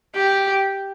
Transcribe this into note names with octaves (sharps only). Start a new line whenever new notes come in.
G4